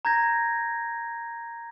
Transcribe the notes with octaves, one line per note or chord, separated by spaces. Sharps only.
A#5 G6 G#6 A#6